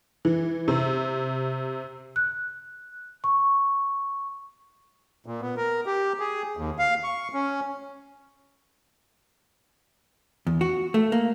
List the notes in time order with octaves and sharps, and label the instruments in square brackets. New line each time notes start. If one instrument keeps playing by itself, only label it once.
[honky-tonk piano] E3
C3
[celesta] F#6
C#6
[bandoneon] A#2
B3
A#4
G4
G#4
D#2
F5
C#6
C#4
[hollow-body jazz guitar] E2
F#4
A3
A#3